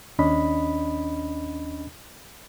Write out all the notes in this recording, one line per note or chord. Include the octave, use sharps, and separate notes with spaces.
D#2 C#4 D4 D#5 B5